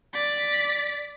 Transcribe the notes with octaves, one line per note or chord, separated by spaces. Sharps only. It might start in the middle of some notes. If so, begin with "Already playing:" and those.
D5 B6